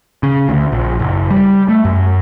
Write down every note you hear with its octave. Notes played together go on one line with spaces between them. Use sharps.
C#3
D2
A#1
F#1
G3
A3
F#2